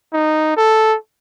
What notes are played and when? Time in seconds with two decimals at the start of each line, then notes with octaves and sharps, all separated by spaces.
0.13 D#4
0.57 A4